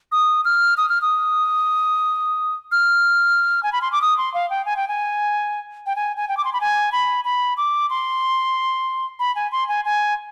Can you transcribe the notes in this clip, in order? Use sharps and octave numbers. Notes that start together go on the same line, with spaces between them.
D#6
F6
D#6
F6
D#6
F6
G#5
B5
C6
D6
D#6
C6
F5
G5
G#5
G5
G#5
G5
G#5
G#5
G5
D6
C6
B5
G#5
B5
B5
D6
C6
B5
G#5
C6
G#5
G#5